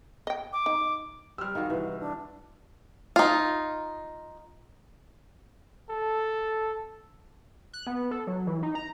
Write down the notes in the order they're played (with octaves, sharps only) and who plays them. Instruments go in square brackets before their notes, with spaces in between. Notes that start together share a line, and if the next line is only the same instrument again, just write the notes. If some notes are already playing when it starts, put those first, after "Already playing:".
[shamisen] D#5 G5
[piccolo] D6
[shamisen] D#4
[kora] G3 C4 [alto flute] G4 [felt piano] E6 F6
[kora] D#3 G#3 F#4 [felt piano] D#4 [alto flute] F5
[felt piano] C2 [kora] E3 [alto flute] B4
[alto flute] D4
[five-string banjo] D#4 F4
[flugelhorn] A4
[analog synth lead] F#6
B3
A4
F#3
E3
D#4
A#5